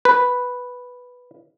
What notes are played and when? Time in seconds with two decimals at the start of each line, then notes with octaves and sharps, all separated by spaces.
0.05 B4